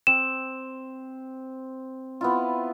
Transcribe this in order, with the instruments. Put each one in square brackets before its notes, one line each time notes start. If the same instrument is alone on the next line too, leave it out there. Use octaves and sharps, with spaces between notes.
[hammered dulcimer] C4 [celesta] E7
[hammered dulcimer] B3 E4 F4